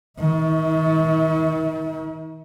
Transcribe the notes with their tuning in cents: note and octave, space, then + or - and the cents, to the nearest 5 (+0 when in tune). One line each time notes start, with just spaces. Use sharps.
D#3 +35 E4 -40